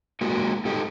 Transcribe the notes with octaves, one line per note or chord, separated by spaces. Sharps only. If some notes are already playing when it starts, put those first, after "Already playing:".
D3 G#3 A#3 F#4 G#4 A#4
G#2 G3 D#4 G4 A4 D#5